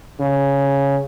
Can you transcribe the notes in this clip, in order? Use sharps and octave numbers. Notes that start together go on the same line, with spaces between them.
C#3